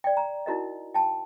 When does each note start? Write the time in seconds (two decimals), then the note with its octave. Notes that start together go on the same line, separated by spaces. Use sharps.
0.04 D5 G5
0.17 A#5
0.46 D#4 E4 F#4 A#4 D#5
0.94 G5 A5